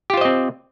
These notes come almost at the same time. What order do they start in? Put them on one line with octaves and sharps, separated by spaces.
G4 F4 C5 D#5 C4